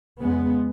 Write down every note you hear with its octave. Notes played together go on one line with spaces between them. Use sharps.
F2 C#3 G#3 B3